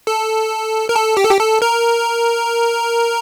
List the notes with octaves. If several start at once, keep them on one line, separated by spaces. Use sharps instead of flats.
A4
A#4
A4
G4
A4
G4
A4
A#4